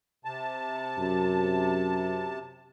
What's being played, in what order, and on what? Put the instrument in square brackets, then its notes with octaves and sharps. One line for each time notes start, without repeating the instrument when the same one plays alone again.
[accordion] C3 A5
[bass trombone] F#2